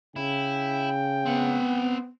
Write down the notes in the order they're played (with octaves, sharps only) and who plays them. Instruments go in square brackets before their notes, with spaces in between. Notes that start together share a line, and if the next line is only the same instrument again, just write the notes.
[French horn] C#3 [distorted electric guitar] E4 [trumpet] G5
[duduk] B3 [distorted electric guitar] C4 F#5